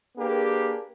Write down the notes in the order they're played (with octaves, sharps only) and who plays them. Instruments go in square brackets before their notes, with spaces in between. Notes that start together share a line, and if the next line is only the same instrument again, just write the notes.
[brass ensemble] A#3 D4 G4 G#4 B4